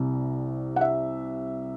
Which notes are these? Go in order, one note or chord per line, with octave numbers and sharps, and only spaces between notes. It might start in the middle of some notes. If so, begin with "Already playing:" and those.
Already playing: C2 C3 G3
F#5
E5